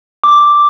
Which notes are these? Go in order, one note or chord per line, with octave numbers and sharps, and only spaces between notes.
D6